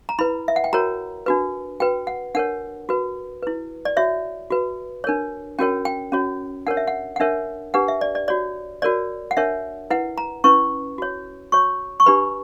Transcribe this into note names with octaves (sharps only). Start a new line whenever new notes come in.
A#5
E4 B4 B5
E5
F#5
G5
F#4 A#4 C#5 A#5
D4 F#4 B4
F#4 B4 G5
F#5
D4 A#4 C#5 F#5
F#4 B4
E4 B4
D5
F#4 C#5 E5
F#4 B4
D4 A#4 C#5
C#4 F#4 A#4 C#5 G5
G5
C#4 F#4 C#5
D4 A#4 C#5 F#5
E5
F#5
F#5
D4 A#4 C#5 E5
D4 G4 B4 F#5
E5
D5
D5
F#4 C#5 D5
F#4 A#4 C#5 D5
F#5
D4 A#4 C#5 E5
E4 B4 F#5
A#5
C#4 E4 B4 C#6
F#4 C#5
F#4 C#5 C#6
C#6
D4 G4 B4 B5